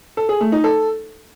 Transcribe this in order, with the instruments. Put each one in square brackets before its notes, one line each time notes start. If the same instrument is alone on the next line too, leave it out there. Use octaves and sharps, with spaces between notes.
[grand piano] A4
G#4
A3
D#4
A4